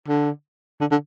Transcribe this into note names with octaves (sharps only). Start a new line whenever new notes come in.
D3
D3
D3